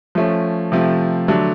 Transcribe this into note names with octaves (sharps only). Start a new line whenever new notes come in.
F3 A3 C#4
C3 F3 A3
D3 F#3 A3 D4